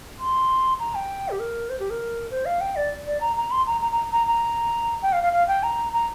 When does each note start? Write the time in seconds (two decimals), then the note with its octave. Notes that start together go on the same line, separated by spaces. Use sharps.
0.19 C6
0.79 A#5
0.95 G5
1.30 G4
1.39 A#4
1.70 C5
1.79 G4
1.90 A#4
2.31 C5
2.45 F5
2.61 G5
2.76 D5
3.06 D5
3.21 A#5
3.36 A#5
3.51 C6
3.66 A#5
3.81 A#5
3.92 A#5
4.12 A#5
4.27 A#5
5.02 G5
5.13 F5
5.23 F5
5.33 F5
5.48 G5
5.63 A#5
5.93 A#5